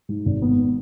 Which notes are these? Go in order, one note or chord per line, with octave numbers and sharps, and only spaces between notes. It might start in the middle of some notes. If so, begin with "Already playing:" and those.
G#2
G#1
B3